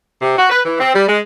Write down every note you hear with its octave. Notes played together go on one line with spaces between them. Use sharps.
C3
F#4
B4
E3
C4
G3
G#3